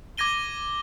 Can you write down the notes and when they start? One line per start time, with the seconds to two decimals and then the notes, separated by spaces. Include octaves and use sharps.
0.18 D6 G#6 A#6 D#7 G7